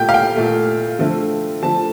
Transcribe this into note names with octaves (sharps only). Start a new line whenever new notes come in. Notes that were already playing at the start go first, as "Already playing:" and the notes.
Already playing: A#2 A3 G5
F5
G5
A#2 A3
D3 F3 A3
D3 F3 A3 A5